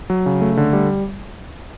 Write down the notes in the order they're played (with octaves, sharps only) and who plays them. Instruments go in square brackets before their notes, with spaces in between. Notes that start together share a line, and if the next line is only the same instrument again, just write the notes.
[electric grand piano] F#3
C#3
A3
D3
G3